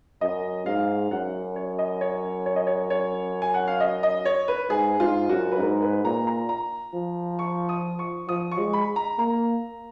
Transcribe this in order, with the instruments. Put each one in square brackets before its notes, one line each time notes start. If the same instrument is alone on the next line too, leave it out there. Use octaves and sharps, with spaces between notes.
[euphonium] F#2 [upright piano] D#5
[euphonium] G#2 [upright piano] F5
[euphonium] F#2 [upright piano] F#5
[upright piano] C#5
D#5
C#5
C#5
D#5
C#5
C#5
G#5
F#5
F5
D#5
D#5
C#5
B4
[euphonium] G#2 [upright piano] G#4
[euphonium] G#2 [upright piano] F4
[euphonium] F#2 [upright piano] F#4
[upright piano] B4
[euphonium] G#2 [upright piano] A#4
[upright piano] B4
[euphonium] A#2 [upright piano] A#5
[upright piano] A#5
A#5
[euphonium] F3
[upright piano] C#6
D#6
C#6
[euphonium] F3 [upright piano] D#6
[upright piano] C#6
[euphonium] G#3
[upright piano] B5
A#5
[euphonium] A#3 [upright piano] A#5